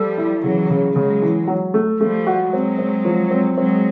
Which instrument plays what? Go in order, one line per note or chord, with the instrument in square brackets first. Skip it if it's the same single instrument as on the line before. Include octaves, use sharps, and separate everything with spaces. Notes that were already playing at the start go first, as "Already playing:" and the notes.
Already playing: [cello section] F3 G3 [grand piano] A4
[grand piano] E4
[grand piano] C#3 [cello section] E3 F#3
[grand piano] C#3
[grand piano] C#3 [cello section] F#3 G#3
[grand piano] E3
F#3
A3
[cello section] F3 G3 [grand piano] A3
[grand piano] F#4
[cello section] F#3 G#3 [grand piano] C4
[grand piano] C4
F3
C4
[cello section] F#3 G#3 [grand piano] C4